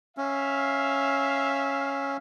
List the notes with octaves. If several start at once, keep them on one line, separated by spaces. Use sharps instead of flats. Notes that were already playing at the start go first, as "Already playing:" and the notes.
C#4 E5 F5